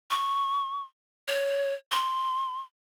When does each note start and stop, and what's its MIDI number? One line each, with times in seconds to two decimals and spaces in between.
0.10 0.83 85
1.28 1.73 73
1.92 2.61 84